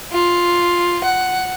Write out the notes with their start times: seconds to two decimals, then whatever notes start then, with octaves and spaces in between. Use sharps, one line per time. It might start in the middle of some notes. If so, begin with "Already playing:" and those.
0.12 F4
1.04 F#5